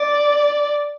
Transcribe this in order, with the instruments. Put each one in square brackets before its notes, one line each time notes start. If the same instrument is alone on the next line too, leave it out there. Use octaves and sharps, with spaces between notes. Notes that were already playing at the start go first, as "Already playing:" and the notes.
Already playing: [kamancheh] D5